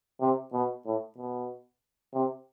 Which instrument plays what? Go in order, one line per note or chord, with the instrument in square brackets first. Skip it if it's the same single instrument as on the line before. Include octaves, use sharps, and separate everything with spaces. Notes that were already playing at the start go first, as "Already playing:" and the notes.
[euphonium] C3
B2
A2
B2
C3